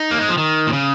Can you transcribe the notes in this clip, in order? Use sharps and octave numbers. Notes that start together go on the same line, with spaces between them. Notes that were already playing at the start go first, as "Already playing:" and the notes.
Already playing: D#4
A#3
G#3
F3
D#3
A#2
C#3